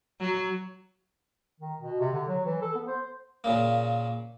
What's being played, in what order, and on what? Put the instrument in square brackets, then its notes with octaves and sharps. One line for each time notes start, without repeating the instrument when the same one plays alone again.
[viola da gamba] F#3
[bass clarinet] D#3
B2
C3
D3
F#3
E3
A4
B3
C5
[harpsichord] A#2 C#3 A#3